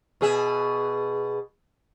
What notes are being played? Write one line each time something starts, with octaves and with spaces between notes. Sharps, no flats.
B2 G#4 E5